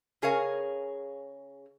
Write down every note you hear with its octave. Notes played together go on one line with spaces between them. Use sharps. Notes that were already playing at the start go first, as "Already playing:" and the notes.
C#3 G#4 A#4 C#5 F5 G#5